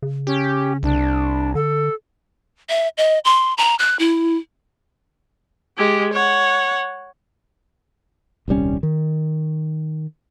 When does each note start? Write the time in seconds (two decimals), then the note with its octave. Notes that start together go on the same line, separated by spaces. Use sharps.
0.02 C#3
0.27 C#4 G4
0.83 C2 D4
1.55 D3 A4
2.69 E5
2.98 D#5
3.25 C6
3.58 A#5
3.79 F#6
3.99 E4
5.77 G#3 G4
6.13 C#5 F#5
8.48 D#1 C2 G3 C#4
8.83 D#3